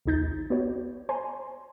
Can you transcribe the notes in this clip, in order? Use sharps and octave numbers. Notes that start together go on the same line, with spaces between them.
A#1 D#2 D#4 G6 A6
B3 F#4 C#5
C5 G#5 A#5 C6